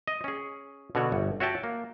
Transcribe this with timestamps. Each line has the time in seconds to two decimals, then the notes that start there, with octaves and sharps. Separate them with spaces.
0.07 D#5
0.24 C#4 G#4
0.95 B2 D3 F#4 C#5 F#5
1.12 G1
1.40 F#4 C#5 E5 G5 A5
1.64 A#3